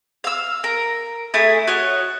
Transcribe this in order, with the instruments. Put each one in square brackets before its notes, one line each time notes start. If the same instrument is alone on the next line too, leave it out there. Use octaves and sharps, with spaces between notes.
[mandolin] F5 E6
A#4
A3 E4 G#4
F#4 C#5 D#5